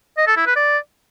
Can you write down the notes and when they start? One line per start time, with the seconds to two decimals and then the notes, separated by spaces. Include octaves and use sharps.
0.18 D#5
0.27 A4
0.37 E4
0.47 B4
0.56 D5